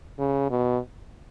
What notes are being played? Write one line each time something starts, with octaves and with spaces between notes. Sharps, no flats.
C#3
B2